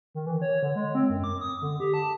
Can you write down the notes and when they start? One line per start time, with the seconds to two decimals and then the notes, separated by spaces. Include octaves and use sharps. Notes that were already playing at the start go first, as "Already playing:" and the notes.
0.15 D#3
0.26 E3
0.42 C#5
0.63 D3
0.75 G#3
0.95 C4
1.10 F#2
1.24 D6
1.41 D#6
1.62 D3
1.80 G4
1.94 A5